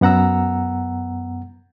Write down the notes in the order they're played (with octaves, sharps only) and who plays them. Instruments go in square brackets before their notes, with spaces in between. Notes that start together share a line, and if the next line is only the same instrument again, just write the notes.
[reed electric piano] F#2 B3 F#5 A#5 E6